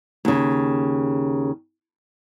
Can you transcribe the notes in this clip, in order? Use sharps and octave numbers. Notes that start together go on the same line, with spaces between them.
D#2 C#3